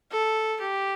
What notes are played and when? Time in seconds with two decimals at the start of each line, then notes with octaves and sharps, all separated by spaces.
0.11 A4
0.60 G4